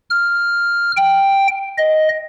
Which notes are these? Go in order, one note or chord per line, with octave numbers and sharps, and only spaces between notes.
F6
G5
D#5